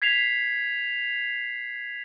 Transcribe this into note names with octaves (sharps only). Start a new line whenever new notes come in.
G#6 B6 C7 F7